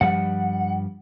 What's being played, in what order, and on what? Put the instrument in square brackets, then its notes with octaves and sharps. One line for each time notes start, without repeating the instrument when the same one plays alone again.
[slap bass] G2 F3 G3 [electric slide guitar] F#5